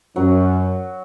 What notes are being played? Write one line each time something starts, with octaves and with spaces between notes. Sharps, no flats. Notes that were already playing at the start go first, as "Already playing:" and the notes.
F#2 F#3